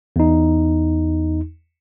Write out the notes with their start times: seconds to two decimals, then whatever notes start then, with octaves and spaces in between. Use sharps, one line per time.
0.16 E2 D#4